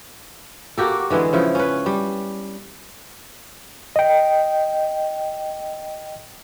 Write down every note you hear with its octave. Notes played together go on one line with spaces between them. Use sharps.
A#3 F#4 G4 A4
D3 E3 G#3 B3
C#3 F3 E4
C#4 B4
G3
D#5 G5